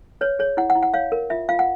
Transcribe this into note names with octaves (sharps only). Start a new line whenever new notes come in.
B4 C#5
G#4 C#5
E4 F#5
F#5
E4
F#5
C#5 F5
A#4
F4 E5
F4 F5
F#5